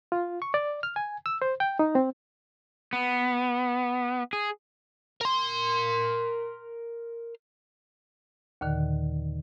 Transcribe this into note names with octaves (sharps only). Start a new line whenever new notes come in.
F4
C#6
D5
F6
G#5
E6
C5
G5
D#4
C4
B3
G#4
A#4 C6
D#2 A#2 D3 D#3